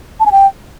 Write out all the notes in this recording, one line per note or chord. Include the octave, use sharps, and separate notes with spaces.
A5
G#5
G5